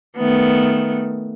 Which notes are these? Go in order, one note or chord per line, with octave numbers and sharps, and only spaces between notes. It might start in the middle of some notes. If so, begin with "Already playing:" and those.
D#3 A3 B3